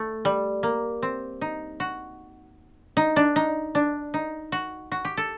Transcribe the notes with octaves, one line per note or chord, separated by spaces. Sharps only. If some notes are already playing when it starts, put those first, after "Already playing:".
Already playing: A3
G3
A#3
C4
D#4
F#4
D#4
D4
D#4
D4
D#4
F#4
F#4
G4
A4